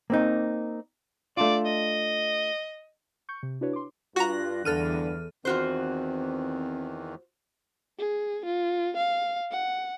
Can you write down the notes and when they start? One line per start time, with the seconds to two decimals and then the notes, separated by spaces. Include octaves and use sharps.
0.10 A#3 C4 D#4
1.37 A3 D4 F4 D5
1.65 D#5
3.29 C#6 G6 C#7
3.43 C3
3.61 D4 E4 F#4 B4 C#5
3.73 C6 D6
4.16 G2 F4 F#4 A#5 F#6 A#6
4.65 E2 G2 D3 A4 F6 D#7
5.45 E2 D#3 E3 C4 F4 F#4 C5
7.99 G#4
8.45 F4
8.97 F5
9.51 F#5